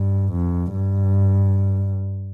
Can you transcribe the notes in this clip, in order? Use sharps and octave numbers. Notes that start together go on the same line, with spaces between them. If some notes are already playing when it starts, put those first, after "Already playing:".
Already playing: G2
F2
G2